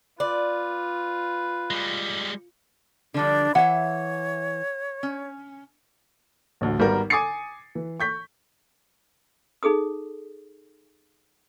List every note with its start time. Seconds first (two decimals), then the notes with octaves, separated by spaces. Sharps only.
0.20 F4 B4 D5
1.71 G3 G#3
3.14 D3 F3 G3 D4
3.55 E3 C#5 E5 F#5
5.03 C#4
6.61 A1 D2
6.79 G#1 G3 B3 F#4 A#4 A#5
7.10 G#5 D6 D#6 A6 C7 C#7
7.75 E3
8.00 C#6 G6 B6
9.63 D#4 G#4 A4 D#6